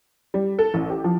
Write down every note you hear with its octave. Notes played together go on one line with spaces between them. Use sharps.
G3
A4
A1
G4
F3